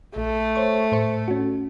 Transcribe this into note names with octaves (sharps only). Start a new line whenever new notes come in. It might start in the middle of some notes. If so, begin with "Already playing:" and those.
A#1 A3
C5 C#5 C#6
A2 C5 C#7
C#4 F#4